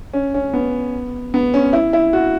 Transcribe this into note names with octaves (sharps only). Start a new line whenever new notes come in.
C#4
C#4
B3
B3
C#4
E4
E4
F#4